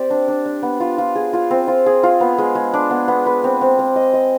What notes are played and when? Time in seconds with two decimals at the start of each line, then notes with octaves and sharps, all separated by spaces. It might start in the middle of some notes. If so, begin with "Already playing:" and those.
Already playing: C4 G4 D5
0.10 D4
0.28 D4
0.46 D4
0.63 B3
0.80 F4
0.98 F4
1.16 G#4
1.33 F4
1.51 C4
1.68 F4
1.86 G#4
2.03 F4
2.21 B3
2.38 G#3
2.55 G#3
2.74 D4
2.91 B3
3.08 B3
3.26 B4
3.44 C4
3.61 C4
3.79 C4
3.96 D#5
4.14 D#5